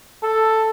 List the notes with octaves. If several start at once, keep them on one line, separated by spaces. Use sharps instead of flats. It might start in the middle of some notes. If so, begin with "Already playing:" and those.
A4